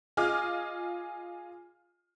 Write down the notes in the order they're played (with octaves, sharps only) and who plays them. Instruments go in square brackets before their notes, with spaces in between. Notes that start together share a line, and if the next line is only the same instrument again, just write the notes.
[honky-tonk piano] F4 G#4 D#5 D6 F6